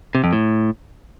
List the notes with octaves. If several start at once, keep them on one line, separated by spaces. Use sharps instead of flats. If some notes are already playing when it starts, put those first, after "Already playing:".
C3
F2
A2